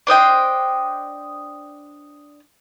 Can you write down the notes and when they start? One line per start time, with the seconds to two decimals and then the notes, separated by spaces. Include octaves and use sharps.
0.07 D4 C5 D#5 G5